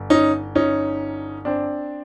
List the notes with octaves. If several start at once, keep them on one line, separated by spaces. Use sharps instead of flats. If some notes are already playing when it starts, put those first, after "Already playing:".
Already playing: G1
C#4 D#4
C#4 D#4
C4 D4